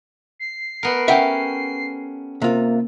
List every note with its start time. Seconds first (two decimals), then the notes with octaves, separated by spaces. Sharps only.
0.39 C7
0.83 A3 B3 A#4
1.08 C#4 G4 E5 F#5 G5
2.42 C3 A#3 F4